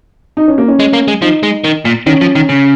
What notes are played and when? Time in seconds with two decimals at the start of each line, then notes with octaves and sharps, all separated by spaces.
0.37 D#4
0.48 C#4
0.58 A#3
0.68 C#4
0.80 G#3
0.93 A#3
1.08 G#3
1.22 F3 D#4
1.43 G#3
1.64 D#3
1.85 A#2
2.06 D#3 C#4
2.21 F3
2.35 D#3
2.49 C#3